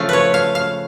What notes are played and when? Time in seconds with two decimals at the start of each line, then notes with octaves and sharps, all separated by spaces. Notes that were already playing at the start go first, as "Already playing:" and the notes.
Already playing: C#3 F3 A3 F5
0.09 B4 C#5
0.34 F5
0.55 F5